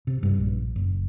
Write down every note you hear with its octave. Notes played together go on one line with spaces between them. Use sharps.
C3
G2
A#1
F#1